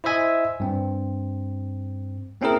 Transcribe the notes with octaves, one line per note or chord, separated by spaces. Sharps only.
E4 C5 D#5 E5 G#5
G2 C4
A#3 C4 C#4 E4 G#4 A#4